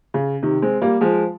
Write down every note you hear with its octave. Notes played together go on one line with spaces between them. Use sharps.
C#3
C3 D#3
G#3 C4
G3 A#3
F3 G#3